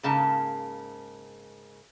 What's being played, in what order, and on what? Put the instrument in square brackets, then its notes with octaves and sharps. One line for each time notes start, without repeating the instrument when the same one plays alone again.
[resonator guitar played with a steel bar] G#2 C#3 A#3 A5